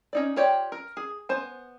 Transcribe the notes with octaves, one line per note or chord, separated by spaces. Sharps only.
C#4 D#4 D5
F4 G4 C#5 D5 G5
A#4
G#4
B3 C5 G#5